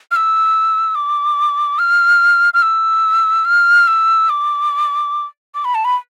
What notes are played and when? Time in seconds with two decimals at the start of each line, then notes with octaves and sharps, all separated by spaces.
0.11 F6
0.16 E6
0.95 D6
1.79 F6
2.54 F6
2.62 E6
3.45 F6
3.87 E6
4.29 D6
5.55 D6
5.65 B5
5.75 A5
5.85 B5